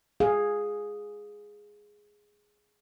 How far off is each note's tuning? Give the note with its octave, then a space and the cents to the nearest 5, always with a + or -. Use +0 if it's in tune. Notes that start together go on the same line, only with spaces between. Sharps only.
G#4 +0 F5 +15